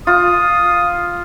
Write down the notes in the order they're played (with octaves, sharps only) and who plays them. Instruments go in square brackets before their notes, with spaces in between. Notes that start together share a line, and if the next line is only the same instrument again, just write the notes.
[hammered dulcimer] F4 [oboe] D#6